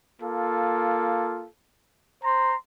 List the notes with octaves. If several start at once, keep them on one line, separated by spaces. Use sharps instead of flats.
A#3 F4 A4
C5 A#5 C6